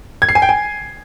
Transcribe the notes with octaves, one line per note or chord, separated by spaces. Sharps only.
G#6
C7
G#5
G5
G#5